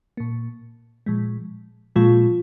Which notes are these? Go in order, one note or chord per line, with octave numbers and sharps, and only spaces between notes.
A#2 A#3
A#2 F3 G#3
A#2 F3 G#3 F4